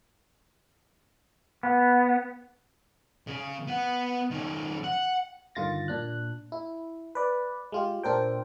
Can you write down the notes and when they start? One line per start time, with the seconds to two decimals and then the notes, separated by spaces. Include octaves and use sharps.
1.63 B3
3.27 C#3
3.68 B3 F#5
4.31 D#3 C#4
4.84 F#5
5.55 G2 D3 D#3 F4 A6 A#6
5.88 A#2 D4 F#6
6.52 E4
7.15 B4 D5
7.72 G#3 F4 G4
8.04 A#2 D4 A4 A#4 C5 G5